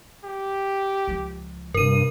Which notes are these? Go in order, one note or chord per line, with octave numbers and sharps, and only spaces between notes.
G4
C#2 F3
G2 C3 A#3 A#4 D#7